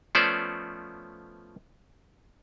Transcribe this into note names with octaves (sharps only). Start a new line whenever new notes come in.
F3 A3 B3 C#4 C5 D5